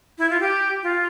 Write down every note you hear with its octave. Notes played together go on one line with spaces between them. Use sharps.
E4
F4
G4
F4